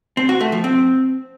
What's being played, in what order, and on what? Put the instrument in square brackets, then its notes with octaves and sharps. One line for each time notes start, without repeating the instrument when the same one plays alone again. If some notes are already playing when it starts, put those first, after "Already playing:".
[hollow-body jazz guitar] C4
F#4
A3
F3
C4